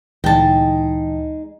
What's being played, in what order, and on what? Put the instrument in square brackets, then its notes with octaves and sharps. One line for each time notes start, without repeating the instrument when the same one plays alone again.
[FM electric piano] D2 A#2 [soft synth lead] E3 [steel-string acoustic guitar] G#3 D#4 [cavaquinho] G5 A5